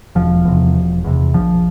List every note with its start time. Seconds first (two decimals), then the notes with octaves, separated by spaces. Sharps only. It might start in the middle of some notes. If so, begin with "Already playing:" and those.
0.15 E1 F3
0.45 E2 C3
0.74 E1
1.04 E2 C3
1.34 A#1 F3